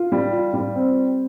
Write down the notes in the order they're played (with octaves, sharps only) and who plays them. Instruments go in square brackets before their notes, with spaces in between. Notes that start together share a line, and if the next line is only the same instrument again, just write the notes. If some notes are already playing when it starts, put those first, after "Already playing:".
Already playing: [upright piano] F4
G3
F4
G3
C4